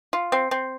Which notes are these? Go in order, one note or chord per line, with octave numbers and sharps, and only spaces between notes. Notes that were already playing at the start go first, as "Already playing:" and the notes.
F4
C4
C4